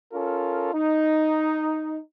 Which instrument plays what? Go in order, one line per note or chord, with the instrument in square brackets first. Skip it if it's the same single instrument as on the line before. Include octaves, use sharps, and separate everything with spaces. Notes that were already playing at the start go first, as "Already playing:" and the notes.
[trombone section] C#4 F4 A4 A#4
D#4